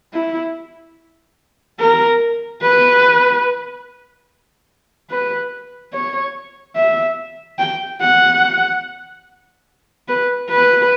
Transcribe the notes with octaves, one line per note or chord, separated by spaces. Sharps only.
E4
A#4
B4
B4
C#5
E5
G5
F#5
B4
B4